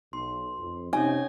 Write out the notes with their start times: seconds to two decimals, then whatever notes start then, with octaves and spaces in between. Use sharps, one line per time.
0.13 B1 C6
0.59 F2
0.93 C3 C#4 D#4 C#5 G#5